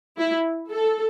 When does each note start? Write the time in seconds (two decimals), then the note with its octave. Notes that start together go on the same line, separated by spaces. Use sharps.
0.18 E4
0.70 A4